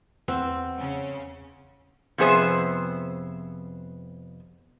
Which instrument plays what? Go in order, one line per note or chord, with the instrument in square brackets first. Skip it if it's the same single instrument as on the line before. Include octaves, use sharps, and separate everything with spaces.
[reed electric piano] E2 F#5 E6 [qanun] C4
[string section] C#3 C#4
[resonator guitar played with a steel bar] F2 C3 B3 G#4 C5 E5